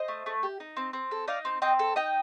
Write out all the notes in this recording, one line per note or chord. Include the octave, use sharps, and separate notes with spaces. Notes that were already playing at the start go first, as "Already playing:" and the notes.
Already playing: C5 D#5
A3
A3
G4
D#4
C4
C4
A4
D#4 D5 F5
C4
C4 D#5 G5
A4
D#4 D#5 G5